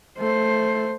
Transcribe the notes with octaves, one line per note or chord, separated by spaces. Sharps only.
A3 C5